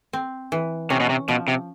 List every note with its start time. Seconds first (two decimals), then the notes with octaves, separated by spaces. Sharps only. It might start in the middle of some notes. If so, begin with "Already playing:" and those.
0.13 C4
0.52 E3
0.90 C3 C#4
1.00 B2
1.09 C3
1.28 B2 F3
1.48 C3